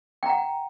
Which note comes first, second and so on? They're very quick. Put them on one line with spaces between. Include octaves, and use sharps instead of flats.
G5 A#5 F#5